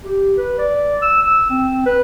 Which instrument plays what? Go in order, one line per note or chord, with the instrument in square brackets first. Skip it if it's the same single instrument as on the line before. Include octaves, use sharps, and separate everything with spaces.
[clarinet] G4
B4
D5
E6
E6
C4
B4